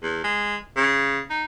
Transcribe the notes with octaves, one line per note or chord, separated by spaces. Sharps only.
E2
G#3
C#3
D#4